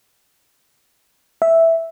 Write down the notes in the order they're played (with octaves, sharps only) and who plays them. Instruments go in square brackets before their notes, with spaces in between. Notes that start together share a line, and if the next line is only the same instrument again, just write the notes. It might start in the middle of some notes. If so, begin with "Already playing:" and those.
[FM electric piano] E5